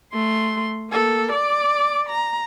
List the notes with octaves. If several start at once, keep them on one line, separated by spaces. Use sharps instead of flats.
A3 C6
A#3 A4
D5 D6
A#5